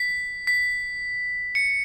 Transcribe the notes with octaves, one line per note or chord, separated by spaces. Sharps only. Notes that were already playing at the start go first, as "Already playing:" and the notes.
Already playing: B6
B6
C#7